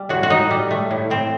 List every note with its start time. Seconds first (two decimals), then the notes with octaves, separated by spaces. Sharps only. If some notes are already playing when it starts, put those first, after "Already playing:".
Already playing: G3
0.09 A2 F#4
0.23 F#4
0.30 A2 D#4
0.51 G3
0.71 A3
0.91 A2
1.10 A2 C4